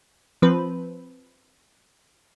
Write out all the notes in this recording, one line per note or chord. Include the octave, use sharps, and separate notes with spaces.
F3 C4 B4